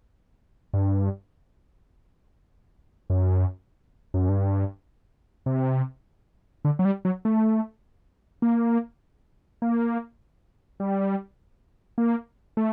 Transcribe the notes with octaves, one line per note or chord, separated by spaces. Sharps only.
G2
F#2
F#2
G2
C3
D3
F#3
G3
F#3
A3
A#3
A#3
G3
A#3
A3